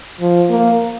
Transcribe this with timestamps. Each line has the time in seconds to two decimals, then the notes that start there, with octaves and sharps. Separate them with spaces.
0.21 F3
0.50 A#3